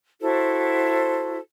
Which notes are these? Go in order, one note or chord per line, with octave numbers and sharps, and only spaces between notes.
E4 F#4 A4 C5